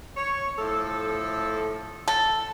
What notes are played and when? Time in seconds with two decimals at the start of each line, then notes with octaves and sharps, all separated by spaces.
0.16 C#5
0.58 A2 F3 A4
2.08 A4